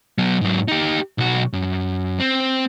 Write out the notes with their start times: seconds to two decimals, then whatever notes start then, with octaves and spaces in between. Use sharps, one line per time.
0.18 F#3 B3
0.41 G#2 F#3
0.68 D#4 G4
1.18 B1 F#4
1.53 F#2
2.19 C4